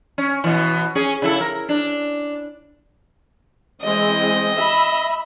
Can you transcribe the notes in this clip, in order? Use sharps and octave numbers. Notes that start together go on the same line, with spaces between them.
C#4
B2 E3
C#4 G#4
C#3 E4 A4
A#4
D4
E3 G#3 C4 D#5
E5 B5